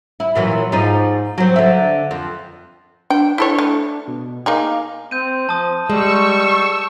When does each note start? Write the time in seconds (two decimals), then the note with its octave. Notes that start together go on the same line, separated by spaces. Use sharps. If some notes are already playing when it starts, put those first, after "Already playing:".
0.20 E4
0.35 A#2 E3 F#3
0.72 G#2 F3 D#4
1.38 F#3 C4
1.56 D3 E5
2.11 F2
3.10 D4 G5
3.38 E4 A4 C#5
3.58 A3
4.07 B2
4.46 A#3 D#4 G#4 F5
5.11 C4 G6 D#7
5.49 F3 A5 D#6
5.90 G3 G#3 C#6 E6